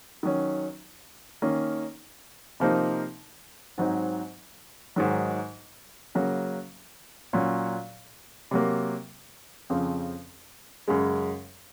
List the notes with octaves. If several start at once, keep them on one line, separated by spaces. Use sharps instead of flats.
D#3 F#3 C#4
D#3 A#3 C#4
C3 F3 A#3 D#4
G#2 F#3 C4 D#4
G#2 D#3 F#3
C#3 F#3 A#3
A#2 F#3 C#4
C3 F#3 A#3
F2 C#3 F3 C4
F#2 C#3 G#3